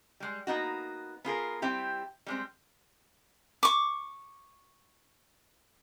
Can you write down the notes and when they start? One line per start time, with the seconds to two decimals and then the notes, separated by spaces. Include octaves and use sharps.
0.20 G3 G#3
0.47 A#3 B3 D#4 F#4
1.24 B3 F4 G#4 A#4
1.62 G3 C4 E4 G4
2.26 G3 G#3 C4
3.63 C#6 D6